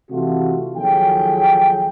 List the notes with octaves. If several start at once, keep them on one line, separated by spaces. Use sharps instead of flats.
C3 E3 A3 F4 F#4
D#2 F3 F#3 G#4 A4 G5